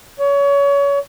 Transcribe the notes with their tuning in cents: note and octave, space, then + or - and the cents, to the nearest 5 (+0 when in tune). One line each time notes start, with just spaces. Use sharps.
C#5 +30